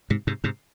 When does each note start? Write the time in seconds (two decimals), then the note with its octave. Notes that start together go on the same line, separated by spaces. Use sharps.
0.10 G#2 C3
0.27 G#2 C3
0.44 G#2 C3